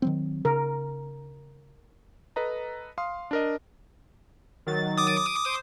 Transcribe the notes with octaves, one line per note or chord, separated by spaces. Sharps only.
D#3 F#3 C4
C#3 A#4
A4 B4 D#5 A#5
F5 C6 D#6
D4 A#4 D#5
D#3 F#3 A6
D6 D#6
C5